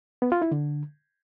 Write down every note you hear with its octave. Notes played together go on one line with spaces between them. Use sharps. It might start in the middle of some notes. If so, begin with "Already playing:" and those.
B3
F4
E4
D3